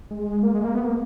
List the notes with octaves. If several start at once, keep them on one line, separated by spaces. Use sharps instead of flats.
G#3
A#3
G#3
A#3
B3
A#3